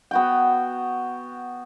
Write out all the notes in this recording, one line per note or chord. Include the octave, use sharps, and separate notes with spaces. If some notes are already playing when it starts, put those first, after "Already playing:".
B3 F#4 G5